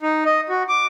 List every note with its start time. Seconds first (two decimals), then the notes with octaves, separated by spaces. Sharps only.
0.02 D#4
0.25 D#5
0.49 F#4
0.69 D6